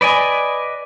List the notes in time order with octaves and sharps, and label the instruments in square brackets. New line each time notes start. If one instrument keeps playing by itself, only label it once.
[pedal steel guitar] B4 D5 D#5 G#5